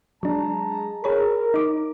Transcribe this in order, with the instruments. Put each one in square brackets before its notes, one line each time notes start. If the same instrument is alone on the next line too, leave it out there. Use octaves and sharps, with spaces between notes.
[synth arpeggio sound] F#3 D4 [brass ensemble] G#3 A5 A#5
[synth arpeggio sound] G#4 C#5 B5 [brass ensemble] A#4
[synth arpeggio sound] D#4 D6